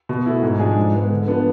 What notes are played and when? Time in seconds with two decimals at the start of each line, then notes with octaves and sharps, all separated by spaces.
0.09 B2
0.26 A3 E4
0.43 G#2
0.60 F3 G#3 D4 G#4
0.76 G#2
0.94 G#3 B3
1.10 D3
1.28 F3 B3 D4